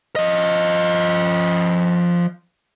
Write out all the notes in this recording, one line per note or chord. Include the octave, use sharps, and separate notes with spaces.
F3 D#5